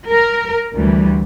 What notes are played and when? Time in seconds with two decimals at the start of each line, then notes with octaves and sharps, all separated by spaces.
0.10 A#4
0.74 D2 E3 G3